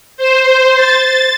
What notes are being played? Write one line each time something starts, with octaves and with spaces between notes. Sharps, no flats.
C5
A6